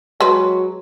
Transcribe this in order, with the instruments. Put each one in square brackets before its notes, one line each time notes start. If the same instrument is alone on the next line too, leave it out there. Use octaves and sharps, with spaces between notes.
[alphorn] F#3 [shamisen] G#3 B4